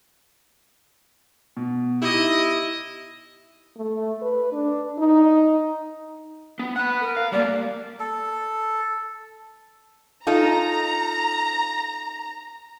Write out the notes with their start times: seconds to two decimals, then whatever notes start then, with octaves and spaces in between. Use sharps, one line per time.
1.57 B2
2.02 D#4 E4 G4 D#5
3.77 A3
4.22 B4
4.53 D4
4.98 D#4
6.59 B3
6.76 F#5 B5 F#6
7.01 A#4
7.17 F5
7.32 G3 A#3 D5
8.00 A4
10.27 D#4 F4 A4 A#5